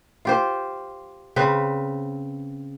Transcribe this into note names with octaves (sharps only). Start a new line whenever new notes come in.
F4 G4 C5
C#3 C4 B4